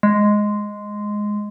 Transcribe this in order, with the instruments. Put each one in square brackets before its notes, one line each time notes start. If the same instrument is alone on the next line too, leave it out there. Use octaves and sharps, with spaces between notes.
[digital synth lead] G#3